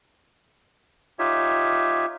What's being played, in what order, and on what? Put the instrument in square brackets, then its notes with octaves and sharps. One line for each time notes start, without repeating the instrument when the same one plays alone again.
[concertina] D#4 F4 G4 C#5 E5